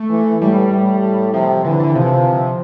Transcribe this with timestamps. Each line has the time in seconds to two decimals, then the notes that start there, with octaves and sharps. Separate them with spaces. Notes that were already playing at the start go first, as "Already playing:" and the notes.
Already playing: A3
0.10 E3
0.41 A2 G3
0.72 A2
1.33 C3 F3
1.64 D3 E3
1.80 D3
1.95 C3 F3